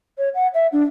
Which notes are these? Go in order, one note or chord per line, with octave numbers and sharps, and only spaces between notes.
C#5
F#5
E5
D4